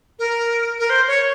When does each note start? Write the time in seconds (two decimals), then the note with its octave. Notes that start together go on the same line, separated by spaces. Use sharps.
0.19 A#4
0.79 A#4
0.89 C5
1.07 C#5